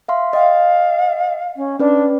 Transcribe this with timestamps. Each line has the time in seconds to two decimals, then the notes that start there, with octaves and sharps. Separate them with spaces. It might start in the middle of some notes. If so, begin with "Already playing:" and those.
0.08 E5 F5 C6
0.33 D#5 F5 G5
1.56 C#4
1.79 C#4 D4 B4 D5